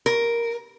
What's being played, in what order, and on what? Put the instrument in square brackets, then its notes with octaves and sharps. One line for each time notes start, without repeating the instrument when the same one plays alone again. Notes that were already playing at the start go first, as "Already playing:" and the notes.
[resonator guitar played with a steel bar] A#4